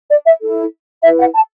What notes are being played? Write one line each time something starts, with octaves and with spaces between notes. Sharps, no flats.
D5
E5
E4 A4
E4 B4 E5
F#5
A5